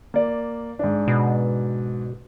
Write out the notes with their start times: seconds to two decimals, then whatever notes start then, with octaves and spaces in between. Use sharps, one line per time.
0.14 A#3 D5
0.79 G#2 D4
1.08 B2